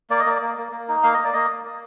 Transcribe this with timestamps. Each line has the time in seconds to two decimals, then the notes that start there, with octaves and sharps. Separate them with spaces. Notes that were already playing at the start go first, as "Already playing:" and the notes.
0.10 A#3 D5
0.20 D#5
0.26 A#3 D5
0.42 A#3
0.58 A#3
0.72 A#3
0.88 D#4
1.03 A#3 F5
1.14 A#3 D#5
1.24 D5
1.33 A#3 D#5
1.50 A#3
1.65 A#3